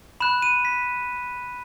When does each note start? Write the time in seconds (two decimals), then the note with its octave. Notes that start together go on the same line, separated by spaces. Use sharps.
0.20 B5 F#6 E7
0.42 D#7
0.65 B6